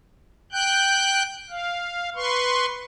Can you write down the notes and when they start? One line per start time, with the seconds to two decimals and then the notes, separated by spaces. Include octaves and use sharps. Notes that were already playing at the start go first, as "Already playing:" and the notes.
0.52 G5 F#6 G6
1.50 F5
2.16 B4 C6 C#6